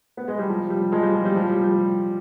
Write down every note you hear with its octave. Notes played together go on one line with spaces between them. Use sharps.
B3
G#3
G3
F3
G3
F3 G#3
G3
F3
G3
F3
G3
G3